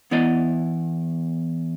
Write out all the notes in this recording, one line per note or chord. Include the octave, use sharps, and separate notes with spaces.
E2 B3 E4 D5 D#5